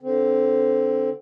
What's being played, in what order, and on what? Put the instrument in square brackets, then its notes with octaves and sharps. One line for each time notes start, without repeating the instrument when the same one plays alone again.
[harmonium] D3 C4